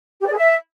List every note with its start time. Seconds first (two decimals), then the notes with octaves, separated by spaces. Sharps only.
0.21 G4
0.26 D5
0.32 G#4
0.37 E5